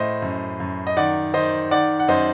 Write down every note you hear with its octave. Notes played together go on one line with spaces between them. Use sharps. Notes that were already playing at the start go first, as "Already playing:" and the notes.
Already playing: A2 C5 D#5
F#2
F#2
D#5
D#3 D5 F#5
D#3 C5 D#5
D#3 D5 F#5
F#5
F#2 C5 D#5